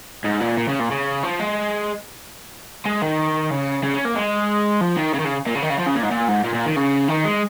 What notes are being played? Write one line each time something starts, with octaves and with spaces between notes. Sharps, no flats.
G#2
A#2
A#2
C#3
A#2
C#3
F3
G#3
G#3
D#3
C#3
C#3
C#4
A#3
G#3
F3
D#3
C#3
D#3
C#3
A#2
C#3
D#3
C#3
F3
C#3
A#2
G#2
A#2
G#2
A#2
A#2
D#3
C#3
D#3
G#3